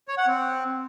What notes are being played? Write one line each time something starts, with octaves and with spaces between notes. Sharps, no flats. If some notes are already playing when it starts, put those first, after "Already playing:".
C#5
F#5
C4